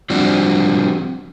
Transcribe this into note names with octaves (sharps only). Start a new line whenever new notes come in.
F3 G3 C4 D4 F#4